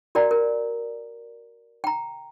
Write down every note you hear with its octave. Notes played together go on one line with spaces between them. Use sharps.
F#4 A#4 D5 G5 A#5
A#4
G5 A#5